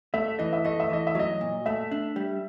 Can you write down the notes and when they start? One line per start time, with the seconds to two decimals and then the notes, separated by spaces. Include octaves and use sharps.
0.14 A3 E5
0.39 E3 D#5
0.53 E5
0.65 A3 D#5
0.80 E5
0.89 E3 D#5
1.07 E5
1.15 F#3 D#5
1.41 A#2
1.66 A3 E5
1.91 D4
2.16 G3